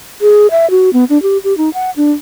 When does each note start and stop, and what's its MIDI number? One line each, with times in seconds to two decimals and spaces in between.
0.21 0.47 68
0.51 0.69 76
0.70 0.90 66
0.93 1.04 59
1.10 1.21 62
1.22 1.38 67
1.44 1.56 67
1.58 1.69 63
1.74 1.91 78
1.97 2.11 62